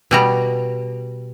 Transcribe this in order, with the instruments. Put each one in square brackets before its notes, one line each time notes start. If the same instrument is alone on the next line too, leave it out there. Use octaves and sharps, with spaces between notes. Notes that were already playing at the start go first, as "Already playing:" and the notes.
[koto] B2 G3 A#5